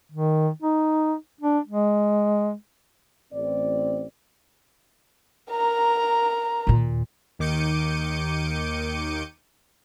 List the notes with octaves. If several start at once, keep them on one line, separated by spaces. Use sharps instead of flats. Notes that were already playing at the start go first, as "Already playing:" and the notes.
D#3
D#4
D4
G#3
A1 C4 D5
A#4 A#5
D#2 A#2
D#2 D#3 D6 G6 C#7 D#7